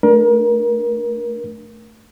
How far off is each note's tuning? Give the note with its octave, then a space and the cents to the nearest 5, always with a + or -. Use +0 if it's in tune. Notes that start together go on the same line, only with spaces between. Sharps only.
A3 +0 D4 +0 A#4 +30